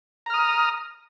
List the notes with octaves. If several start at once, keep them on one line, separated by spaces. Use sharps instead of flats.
A#5 D#6 F6